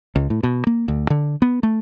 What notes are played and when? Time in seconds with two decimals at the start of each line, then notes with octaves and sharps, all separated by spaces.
0.16 C#2
0.30 A2
0.43 B2
0.67 A#3
0.88 D2
1.10 D3
1.42 B3
1.63 A3